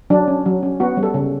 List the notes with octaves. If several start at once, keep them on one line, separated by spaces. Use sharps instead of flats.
F#3 D4
C#4
F#3
C#4
B3 F#4
G3
A4
C#3